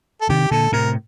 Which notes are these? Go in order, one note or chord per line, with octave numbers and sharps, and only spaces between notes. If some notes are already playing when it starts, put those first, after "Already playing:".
A4
C3 D#3 G4
A#2 D3 A4
A2 C3 A#4